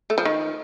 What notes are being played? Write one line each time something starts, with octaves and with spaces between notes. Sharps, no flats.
A3
F3
D#3